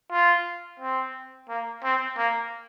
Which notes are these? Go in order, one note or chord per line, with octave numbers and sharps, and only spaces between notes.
F4
C4
A#3
C4
A#3